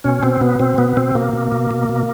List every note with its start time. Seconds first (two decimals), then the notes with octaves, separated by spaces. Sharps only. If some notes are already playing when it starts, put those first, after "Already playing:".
0.04 B2 C#4
0.23 B2 C4
0.41 B2 B3
0.59 B2 C4
0.78 B2 B3
0.97 B2 C4
1.15 B2 A#3
1.33 B2
1.52 B2
1.71 B2
1.89 B2